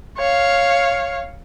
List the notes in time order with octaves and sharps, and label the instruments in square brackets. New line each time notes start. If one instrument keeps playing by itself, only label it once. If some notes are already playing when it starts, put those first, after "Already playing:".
[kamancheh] C#5 F5